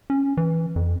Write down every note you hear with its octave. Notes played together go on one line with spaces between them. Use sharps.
C#4
E3
F2